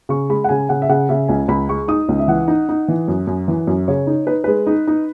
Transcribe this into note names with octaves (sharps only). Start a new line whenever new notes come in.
C#3 C#6
G#3 B5
F#5
C#3 G#5
C#3 F#5
E5
C#3 F#5
C#3 E5
C#2 G#5
C#2 B5
G#3 C#6
D#4 D#6
C#2
E5
E3 F#5
D#4
D#4
E3
F#2
F#2
E3
F#2
C#3 C#5
D#4
D#4 B4
G#3 B4
D#4
D#4